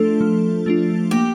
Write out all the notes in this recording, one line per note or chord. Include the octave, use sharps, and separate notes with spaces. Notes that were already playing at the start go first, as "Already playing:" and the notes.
Already playing: F3 A3 D4 F4 A4
F3
A3 D4 F4
A#3 G4